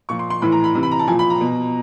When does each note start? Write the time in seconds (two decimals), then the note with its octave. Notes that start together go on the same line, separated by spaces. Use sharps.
0.09 A#2 F3 C#6
0.19 C6
0.30 C6
0.42 A2 E3 B5
0.52 A#5
0.64 B5
0.75 C3 E3
0.83 B5
0.91 A#5
0.99 A5
1.08 F3 G#5
1.12 A#2
1.19 B5
1.30 A#5
1.41 B2